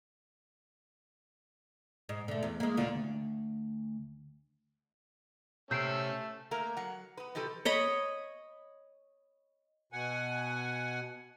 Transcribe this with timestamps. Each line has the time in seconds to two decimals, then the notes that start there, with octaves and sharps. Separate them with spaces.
2.09 G#2
2.28 D3 A3
2.43 E2
2.60 G#3 A#3
2.77 D#2 D3 F4
2.96 D2
5.71 C3 A3 C#4 E6 G6 C7 D7
6.51 A3 A#3 A#4
6.77 F#3 F#5
7.17 B3 B4
7.35 B2 F3 G4 A4 B4
7.65 C#5 D#5 B5
9.93 B2 F#5 G#5